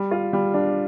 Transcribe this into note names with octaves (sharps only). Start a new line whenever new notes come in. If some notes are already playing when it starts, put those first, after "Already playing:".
Already playing: G3
F4
G3
D4